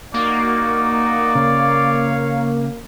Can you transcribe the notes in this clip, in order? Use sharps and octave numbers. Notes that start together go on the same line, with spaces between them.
A#3 D#4 F#4 D5
C#3 C#5 F5